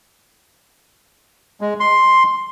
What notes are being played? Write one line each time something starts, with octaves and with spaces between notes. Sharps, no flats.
G#3
C6